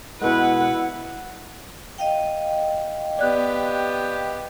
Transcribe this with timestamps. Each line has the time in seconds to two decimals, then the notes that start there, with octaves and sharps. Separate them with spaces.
0.21 B2 G#3 E4 B4 F#5
1.98 D#5 F5 G5
3.19 B3 G4 D5 F#6